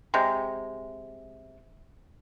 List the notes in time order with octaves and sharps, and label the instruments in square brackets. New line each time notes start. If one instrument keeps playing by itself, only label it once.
[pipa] C3 G#3